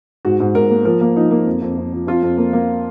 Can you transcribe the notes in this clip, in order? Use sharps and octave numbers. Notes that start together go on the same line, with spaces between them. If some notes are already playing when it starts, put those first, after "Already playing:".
G#2 F#4
G#2
G#2 A#4
A#3
F3 A#4
A#3
F3 D#4
A#3
F2
F2
F2
F3
F2 F4
F2
A#3
A#3